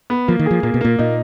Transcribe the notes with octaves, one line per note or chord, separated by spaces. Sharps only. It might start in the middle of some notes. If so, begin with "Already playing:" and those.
B3
F3 A#3
D#3
F3 G#4
A#2 A#3
B2
A#2 A#3
A#2 D#4